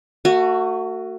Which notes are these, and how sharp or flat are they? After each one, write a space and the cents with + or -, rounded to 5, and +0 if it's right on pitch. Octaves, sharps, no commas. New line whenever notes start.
A3 +40 F#4 +0